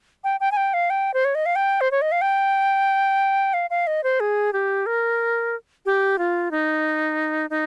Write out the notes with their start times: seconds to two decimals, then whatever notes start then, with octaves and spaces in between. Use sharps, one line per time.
0.24 G5
0.40 G5
0.52 G#5
0.57 G5
0.74 F5
0.90 G5
1.14 C5
1.25 C#5
1.35 D#5
1.46 F5
1.56 G5
1.81 C5
1.91 C#5
2.02 D#5
2.12 F5
2.21 G5
3.54 F5
3.70 F5
3.87 D#5
4.04 C5
4.20 G#4
4.53 G4
4.86 A#4
5.86 G4
6.18 F4
6.51 D#4
7.50 D#4